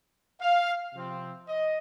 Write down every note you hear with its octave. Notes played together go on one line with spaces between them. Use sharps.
F5
C3 F3 C4
D#5